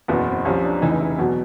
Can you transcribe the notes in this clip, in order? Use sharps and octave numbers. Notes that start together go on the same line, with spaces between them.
F#1 E2 B2 B3
C4
C2 C3 F3 C#4
D4
F1 E2 C#3 E3 D#4
D#4
E4
E2 B2 F#3